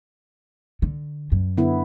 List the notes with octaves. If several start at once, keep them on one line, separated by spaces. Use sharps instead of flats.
D3
F#2
D3 B3 E4